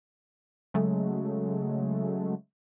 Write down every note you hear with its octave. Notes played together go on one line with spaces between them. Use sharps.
C#3 F#3 G#3 A3